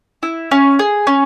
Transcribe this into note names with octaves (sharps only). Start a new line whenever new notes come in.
E4
C#4
G#4
C#4